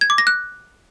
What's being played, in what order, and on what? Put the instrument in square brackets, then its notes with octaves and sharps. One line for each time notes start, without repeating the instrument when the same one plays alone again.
[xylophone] G#6
D6
A#6
F#6